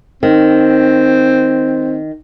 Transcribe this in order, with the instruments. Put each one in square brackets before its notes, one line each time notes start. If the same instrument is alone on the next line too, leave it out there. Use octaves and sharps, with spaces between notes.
[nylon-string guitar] D#3 [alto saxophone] C4